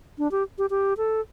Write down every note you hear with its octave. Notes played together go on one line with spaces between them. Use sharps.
D4
G4
G4
G4
A4